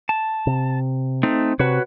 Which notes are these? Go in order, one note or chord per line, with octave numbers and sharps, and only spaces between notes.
A5
C3
A3 C4 D#4
C3 F#4 B4 C#5